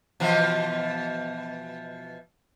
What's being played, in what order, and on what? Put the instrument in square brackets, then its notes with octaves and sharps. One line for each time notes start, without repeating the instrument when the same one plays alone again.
[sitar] B2 E3 F3